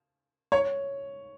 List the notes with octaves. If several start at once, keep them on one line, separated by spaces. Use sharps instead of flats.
C#5